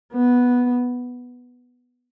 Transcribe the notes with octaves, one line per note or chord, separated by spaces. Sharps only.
B3